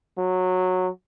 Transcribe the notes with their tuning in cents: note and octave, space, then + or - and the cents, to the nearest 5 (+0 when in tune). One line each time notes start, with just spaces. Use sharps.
F#3 -10